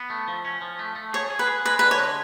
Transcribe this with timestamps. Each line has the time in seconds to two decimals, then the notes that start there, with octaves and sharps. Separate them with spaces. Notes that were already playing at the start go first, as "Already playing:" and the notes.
Already playing: B3
0.10 A3
0.28 F3
0.45 C#4
0.61 F3
0.79 A3
0.96 A3
1.13 G#4 C#5
1.30 G#4
1.39 B4
1.47 G#4
1.65 G#3 B4
1.79 D3 B4
1.91 C#5
1.99 G#3